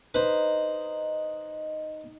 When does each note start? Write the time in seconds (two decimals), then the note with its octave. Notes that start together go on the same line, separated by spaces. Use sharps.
0.14 D#4 B4 C5